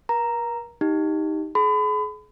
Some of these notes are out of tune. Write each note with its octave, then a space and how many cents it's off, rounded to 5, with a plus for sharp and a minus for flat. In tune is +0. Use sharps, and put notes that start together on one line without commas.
A#4 +40 A#5 +0
D#4 +10 G4 +0
G#4 +35 B5 +35